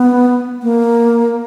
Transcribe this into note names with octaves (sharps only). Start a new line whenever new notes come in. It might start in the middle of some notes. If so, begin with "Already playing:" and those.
Already playing: B3
A#3